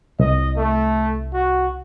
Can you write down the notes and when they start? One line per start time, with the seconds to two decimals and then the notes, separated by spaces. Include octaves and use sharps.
0.20 C2 D#5
0.57 A3
1.33 F#4